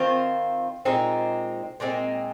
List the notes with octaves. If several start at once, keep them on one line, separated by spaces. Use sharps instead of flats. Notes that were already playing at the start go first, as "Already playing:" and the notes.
Already playing: D#3 C4 F4 C5
A#2 G#3 C4 D#4
A#2 G#3 C4 D#4